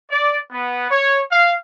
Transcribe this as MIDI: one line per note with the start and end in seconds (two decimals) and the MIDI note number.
0.11 0.37 74
0.52 0.87 59
0.91 1.19 73
1.32 1.52 77